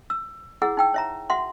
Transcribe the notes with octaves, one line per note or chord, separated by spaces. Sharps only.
E6
E4 G#4 F#5 E6
D#4 G5 E6
C#5 E5 A#5
F#4 E5 F#5 C6